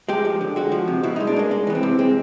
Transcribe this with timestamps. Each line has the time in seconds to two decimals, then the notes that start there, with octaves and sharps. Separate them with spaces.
0.09 G#3 G4
0.25 F3
0.41 D3
0.56 G#3 F#4
0.72 F3
0.88 C3
1.03 B2 E4
1.16 G#3 D#4
1.27 D4
1.36 G#3 A#3
1.51 G#3
1.67 E3 B3
1.75 C4
1.83 C3
1.99 G#3 C4